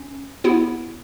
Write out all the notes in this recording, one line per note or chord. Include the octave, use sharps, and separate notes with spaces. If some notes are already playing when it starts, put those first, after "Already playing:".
Already playing: C#4
B3 E4